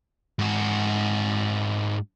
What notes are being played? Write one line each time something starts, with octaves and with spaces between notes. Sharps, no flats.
G#2 F#4